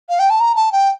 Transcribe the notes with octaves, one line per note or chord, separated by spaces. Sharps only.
F5
G5
A5
A#5
A5
G5